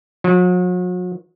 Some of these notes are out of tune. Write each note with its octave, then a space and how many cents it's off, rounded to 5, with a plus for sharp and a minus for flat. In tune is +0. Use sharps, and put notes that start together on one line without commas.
F#3 -40